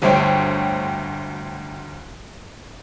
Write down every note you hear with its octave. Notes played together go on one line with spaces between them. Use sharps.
G1 D2 C5 C#5 G5